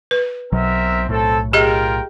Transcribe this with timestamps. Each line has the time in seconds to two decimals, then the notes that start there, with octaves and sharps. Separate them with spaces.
0.11 B4
0.52 B1 B2 F#3 C4 A#4 E5
1.09 B1 A2 C4 A4
1.53 F4 G4 G#4 A#4 D#5 G5